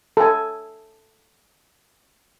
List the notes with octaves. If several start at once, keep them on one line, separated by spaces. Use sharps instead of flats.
A4 G#5